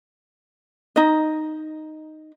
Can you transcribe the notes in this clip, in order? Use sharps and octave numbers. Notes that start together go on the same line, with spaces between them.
D#4 D#5